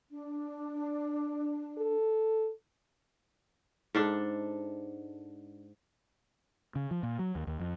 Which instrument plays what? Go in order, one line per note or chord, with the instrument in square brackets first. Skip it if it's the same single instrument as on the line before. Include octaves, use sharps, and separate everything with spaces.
[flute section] D4
[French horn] A4
[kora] G#2 D4 A4
[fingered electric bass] C#3
F3
A#2
F#3
D#2
D#2
F2